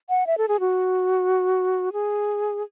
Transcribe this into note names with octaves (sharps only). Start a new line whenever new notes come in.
F#5
E5
A4
G#4
F#4
G#4